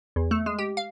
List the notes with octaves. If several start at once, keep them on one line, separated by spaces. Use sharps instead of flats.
E2
A3
G#3
G4
F5